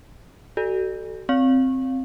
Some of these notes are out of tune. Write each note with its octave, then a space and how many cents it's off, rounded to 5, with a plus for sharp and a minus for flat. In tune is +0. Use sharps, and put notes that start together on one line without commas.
F#4 +35 A4 +0 D5 +30
C4 +0 F5 +20